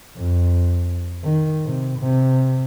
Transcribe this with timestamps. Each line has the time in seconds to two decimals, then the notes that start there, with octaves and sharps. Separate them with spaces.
0.16 F2
1.24 D#3
1.65 C3
1.99 C3